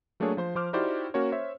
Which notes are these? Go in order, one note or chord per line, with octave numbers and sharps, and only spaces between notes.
F#3 A3 A#3 D4 G#4 C#5
F3 C5 C6
F3 C5 D6 F6
D#4 E4 F#4 G4 C5 D5
A#3 C#4 F#4 A#4 C#5
C5 C#5 E5